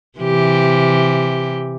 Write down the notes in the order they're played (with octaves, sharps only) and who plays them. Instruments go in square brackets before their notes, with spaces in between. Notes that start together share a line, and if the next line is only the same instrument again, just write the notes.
[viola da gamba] C3 E3 G4